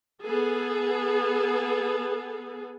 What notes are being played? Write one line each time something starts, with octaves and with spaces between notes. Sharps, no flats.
B3 G#4 A4